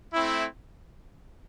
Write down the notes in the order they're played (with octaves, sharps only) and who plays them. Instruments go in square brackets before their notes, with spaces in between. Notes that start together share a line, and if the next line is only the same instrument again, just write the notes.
[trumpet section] A3 C4 E4